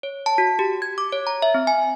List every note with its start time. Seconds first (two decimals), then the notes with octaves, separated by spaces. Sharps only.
0.03 C#5
0.26 A5
0.38 F#4
0.59 G4
0.82 G#6
0.98 D6
1.12 C#5
1.27 A#5
1.42 E5
1.54 C4
1.67 G#5